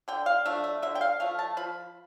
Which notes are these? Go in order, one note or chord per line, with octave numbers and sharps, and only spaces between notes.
D3 G5
F5
F3 A3 D4 E5
E5
D3 E5
G5
F5
F3 A3 F5
A5
F3 B5